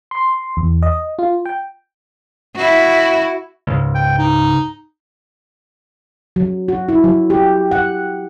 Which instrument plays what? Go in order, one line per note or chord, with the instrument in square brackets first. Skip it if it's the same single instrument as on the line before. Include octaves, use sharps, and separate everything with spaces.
[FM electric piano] C6
E2
D#5
F4
G5
[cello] E4 F#4
[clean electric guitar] C#2 G#2
[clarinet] G5
D#4
[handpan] F#3
F#4
E4
F#3
G4
F#5